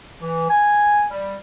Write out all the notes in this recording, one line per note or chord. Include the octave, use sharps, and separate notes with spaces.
E3
G#5
G3